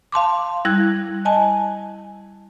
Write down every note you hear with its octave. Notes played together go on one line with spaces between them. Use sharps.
F5 A5 C6 D6
G3 E4 F#6 G#6
D#5 G#5 A5